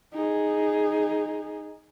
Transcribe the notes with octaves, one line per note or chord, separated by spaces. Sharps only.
D#4 G#4